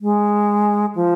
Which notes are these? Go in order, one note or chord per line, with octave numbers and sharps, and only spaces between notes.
G#3
F3